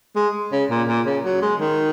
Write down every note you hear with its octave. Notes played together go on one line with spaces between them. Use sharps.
G#3
C#3
A#2
A#2
C#3
F#3
G#3
D#3